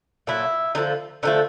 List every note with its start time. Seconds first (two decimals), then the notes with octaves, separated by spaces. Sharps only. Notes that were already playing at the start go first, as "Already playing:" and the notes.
0.27 A#2 F#3 A3 E4
0.75 D3 F3 A3 D#4
1.23 D3 F3 A3 D#4